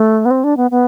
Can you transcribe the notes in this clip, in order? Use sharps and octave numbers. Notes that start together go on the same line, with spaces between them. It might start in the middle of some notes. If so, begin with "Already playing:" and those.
Already playing: A3
B3
C4
D4
B3
B3